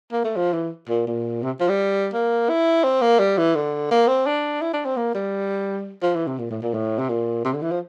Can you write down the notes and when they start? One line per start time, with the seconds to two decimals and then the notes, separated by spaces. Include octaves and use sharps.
0.12 A#3
0.24 A3
0.36 F3
0.53 E3
0.89 A#2
1.07 A#2
1.43 C3
1.61 F3
1.69 G3
2.14 A#3
2.49 E4
2.84 C4
3.01 A#3
3.20 G3
3.38 E3
3.56 D3
3.91 A#3
4.08 C4
4.26 D4
4.62 E4
4.73 D4
4.85 C4
4.97 A#3
5.15 G3
6.03 F3
6.16 E3
6.27 C3
6.39 A#2
6.51 A2
6.62 A#2
6.74 A2
6.99 C3
7.09 A#2
7.45 C3
7.54 D3
7.62 E3
7.71 F3